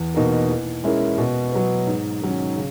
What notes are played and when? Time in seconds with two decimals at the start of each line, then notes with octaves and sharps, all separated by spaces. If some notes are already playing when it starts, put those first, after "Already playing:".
Already playing: E2
0.14 B2 A#3 D#4 A#4
0.48 E3
0.84 G#3 C#4 E4 A#4
1.18 B2
1.52 F#3 B3
1.87 G#2
2.22 D#3 F#3 C#4
2.56 C#3